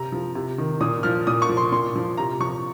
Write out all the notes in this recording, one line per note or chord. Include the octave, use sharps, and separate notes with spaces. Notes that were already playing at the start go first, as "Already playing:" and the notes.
Already playing: C3 A#5
F3
C3
D#3
A#2 D#6
F3 F6
A#2 D#6
C#6
F3
C6
A#2 C6
F3
C3 A#5
F3 C#6